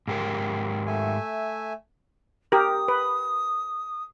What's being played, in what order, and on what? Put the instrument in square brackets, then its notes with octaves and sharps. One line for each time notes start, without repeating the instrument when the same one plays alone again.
[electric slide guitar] G#2 G4 A#4
[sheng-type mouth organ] A3 E5 G#5
[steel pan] G4 A#4 [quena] D#6
[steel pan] B4